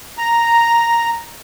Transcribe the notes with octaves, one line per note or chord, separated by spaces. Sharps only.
A#5